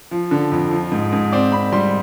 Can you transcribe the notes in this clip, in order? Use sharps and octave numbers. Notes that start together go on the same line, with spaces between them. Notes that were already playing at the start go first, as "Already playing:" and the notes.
F3
D3
F2
F3
G#2
G#2
C4 D5
C4 B5
G3 C6